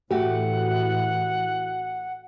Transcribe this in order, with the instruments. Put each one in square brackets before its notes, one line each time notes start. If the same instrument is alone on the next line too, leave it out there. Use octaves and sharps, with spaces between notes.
[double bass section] A2 E3 [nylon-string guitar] A3 G4 [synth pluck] F#4 [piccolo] F#5